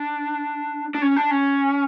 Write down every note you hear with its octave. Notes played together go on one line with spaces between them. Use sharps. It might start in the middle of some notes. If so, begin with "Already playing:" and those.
Already playing: D4
D4
C#4
D4
C#4